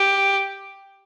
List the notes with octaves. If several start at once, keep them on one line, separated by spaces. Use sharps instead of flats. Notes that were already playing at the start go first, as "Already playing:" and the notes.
Already playing: G4